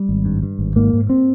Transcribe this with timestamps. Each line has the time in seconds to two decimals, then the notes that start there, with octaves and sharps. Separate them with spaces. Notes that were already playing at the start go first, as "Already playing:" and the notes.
Already playing: G3
0.09 G#1
0.25 G2
0.42 G2
0.59 G#1
0.76 G#2 A#3
0.93 G#2
1.10 C4